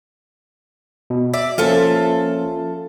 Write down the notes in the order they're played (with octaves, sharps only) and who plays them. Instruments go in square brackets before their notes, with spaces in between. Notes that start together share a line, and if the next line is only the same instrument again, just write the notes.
[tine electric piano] B2
[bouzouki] D5 [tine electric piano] E5
[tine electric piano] F3 A#3 C#4 [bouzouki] F4 A4 E5